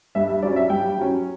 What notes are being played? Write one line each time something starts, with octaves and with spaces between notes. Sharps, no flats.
G2 E5
E5
F#3 C#4 D5
E5
G2 G5
F#3 C#4